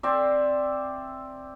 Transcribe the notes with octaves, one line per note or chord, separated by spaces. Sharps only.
C4 D5 E5